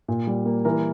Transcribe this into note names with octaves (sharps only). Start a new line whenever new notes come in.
A#2
G3
A#3
E3 A#4